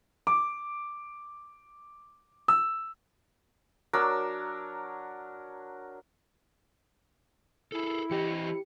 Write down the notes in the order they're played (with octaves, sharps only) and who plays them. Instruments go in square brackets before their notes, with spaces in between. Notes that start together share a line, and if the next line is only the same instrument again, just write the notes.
[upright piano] D6
E6
[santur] F#3 D4 A#4 E6
[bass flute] E4 [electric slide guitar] G#4 A4
[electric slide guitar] E3 C5 D#5 [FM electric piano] G4 C#7